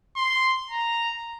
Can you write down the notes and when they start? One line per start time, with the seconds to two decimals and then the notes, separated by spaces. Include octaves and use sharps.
0.16 C6
0.70 A#5